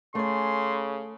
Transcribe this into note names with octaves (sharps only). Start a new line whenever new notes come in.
C#3 A3 G#5 C6